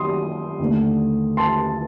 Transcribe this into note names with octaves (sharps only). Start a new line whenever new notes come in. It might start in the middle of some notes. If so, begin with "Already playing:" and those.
Already playing: D#3 F#3 C6 D#6
D#2 D3 A3
A5 C6